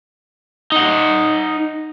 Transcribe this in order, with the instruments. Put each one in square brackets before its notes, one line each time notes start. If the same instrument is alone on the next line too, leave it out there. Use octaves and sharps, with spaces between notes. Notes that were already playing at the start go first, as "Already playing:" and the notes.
[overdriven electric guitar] D#4 F#5